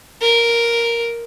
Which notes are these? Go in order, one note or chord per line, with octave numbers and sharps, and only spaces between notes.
A#4